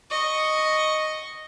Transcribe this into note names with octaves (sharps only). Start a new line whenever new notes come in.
D#5 C#6